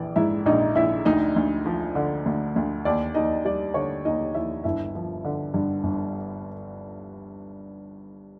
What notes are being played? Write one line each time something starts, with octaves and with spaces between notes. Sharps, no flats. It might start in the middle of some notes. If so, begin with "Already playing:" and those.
Already playing: A#1 E3 D5
G#2 E4 E5
A#1 D#4 D#5
A#1 E4 E5
D2 D#4 D#5
D2
F3
D3
D2
D2
D#2 D5
D#2 D#4 D#5
G3 D5
D3 C#5
D#2 D#4 D#5
D#2 E4 E5
G1 E4 E5
F3
D3
G2
G1